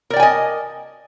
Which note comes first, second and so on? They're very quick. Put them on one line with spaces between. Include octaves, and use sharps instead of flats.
A#4 D5 G5 G#5 D#5